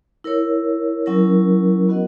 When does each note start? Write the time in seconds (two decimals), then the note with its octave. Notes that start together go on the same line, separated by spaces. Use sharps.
0.24 E4 A#4 C#5
1.06 F#3 C#4 E4 A#4
1.89 B3 F#4 A#4 D#5 F#5